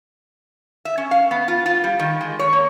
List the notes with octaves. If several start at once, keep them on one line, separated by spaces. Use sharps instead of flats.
E5
C#4
F5
B3
F4
F4
G3
D#3
G#3
C#5
A#3